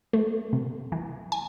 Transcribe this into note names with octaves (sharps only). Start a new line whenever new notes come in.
A3
C3
E3
G#5